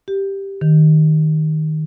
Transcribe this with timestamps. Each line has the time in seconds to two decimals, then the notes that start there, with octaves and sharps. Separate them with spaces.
0.08 G4
0.61 D#3